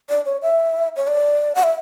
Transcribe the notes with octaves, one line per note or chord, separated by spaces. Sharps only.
D5
C#5
E5
C#5
D5
F#5
E5